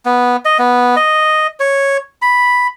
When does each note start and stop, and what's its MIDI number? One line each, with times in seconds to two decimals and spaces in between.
0.06 0.37 59
0.45 0.58 75
0.59 0.96 59
0.96 1.47 75
1.60 1.97 73
2.22 2.67 83